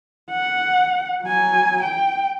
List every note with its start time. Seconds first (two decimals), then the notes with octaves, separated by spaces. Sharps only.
0.31 F#5
1.23 F#3 G#5
1.83 G5